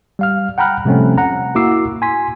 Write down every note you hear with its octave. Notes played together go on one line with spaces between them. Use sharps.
G3 F5 F6
F#5 G5 A#5 B5 F6 F#6
C3 F3 G3 A3 C4 C#4
F#5 A#5
A#3 E4 F#4 D6 E6 C7
G#5 C6 B6